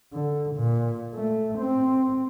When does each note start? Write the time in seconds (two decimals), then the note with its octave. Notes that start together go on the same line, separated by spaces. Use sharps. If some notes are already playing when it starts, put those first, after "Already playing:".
0.13 D3
0.55 A#2
1.14 A3
1.59 C4